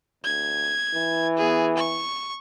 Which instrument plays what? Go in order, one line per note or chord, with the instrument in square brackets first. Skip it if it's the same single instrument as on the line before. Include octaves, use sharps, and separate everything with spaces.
[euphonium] D2 [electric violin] G#6
[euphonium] E3
[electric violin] B3 G#4
C#6